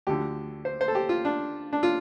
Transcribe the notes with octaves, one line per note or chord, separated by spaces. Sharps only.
D2 D3 F3 G4
C5
C5
A4
G4
F4
D4
D4
F4